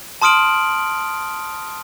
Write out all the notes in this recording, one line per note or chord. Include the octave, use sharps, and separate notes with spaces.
A5 C6 D#6 F6 D7 F#7